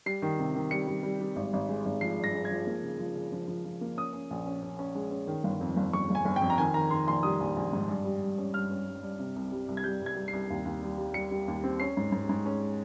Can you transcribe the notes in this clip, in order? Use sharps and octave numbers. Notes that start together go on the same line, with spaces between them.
G3 C7
D#3
C3
D#3
G3 C#7
G3
G3
G3
G#1
G#1
G#3
G#1
F3 C7
G2
A#6
G#3
G#6
F3
A#3
C#3
F3
C#3
F3
F3
F3
A#3
C#4 D#6
C#4
A#1
C#4
C#4
C#4
G#3
C#4
D#3
G1
F2
G1
G1 C#6
G1
G#5
G1
G5
F2
A#5
D#3 G#5
D#3 A#5
D#3 C6
A#1 C6
G3 D#6
A#1
A#1
G#2
G2
G3
G2
C#4
G2 F6
C#4
G2
G2
C3
C2
G3
C2
G#6
G3 G6
C2
G#6
G3
C7
C2
D#2
D#2
G3
G3
G3 C#7
G3
D#2
C4
C#4 C7
G#2
G#2
G#2
C#4